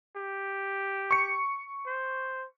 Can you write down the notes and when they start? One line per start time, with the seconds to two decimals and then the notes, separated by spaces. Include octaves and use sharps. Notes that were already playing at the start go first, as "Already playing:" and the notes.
0.16 G4
1.11 C#6 C#7
1.86 C5